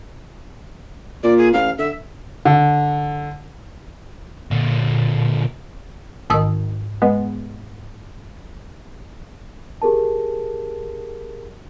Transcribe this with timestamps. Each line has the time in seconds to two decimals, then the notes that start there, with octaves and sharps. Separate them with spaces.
1.23 A#2 D5
1.38 G#4
1.53 A1 F5
1.79 D3 E5
2.45 D3
4.51 A#2 D3
6.30 A1 G#2 D#3 D#6 E6
7.02 G#3 B3
9.82 G4 G#4 A#4 A5